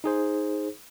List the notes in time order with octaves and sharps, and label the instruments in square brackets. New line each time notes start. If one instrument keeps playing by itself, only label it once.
[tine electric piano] D#4 G#4 C5